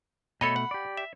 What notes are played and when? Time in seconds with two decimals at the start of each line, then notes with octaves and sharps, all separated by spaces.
0.41 B2 A3 A4 C#5 D#5 B5
0.56 F#5
0.71 G4 D5
0.97 E5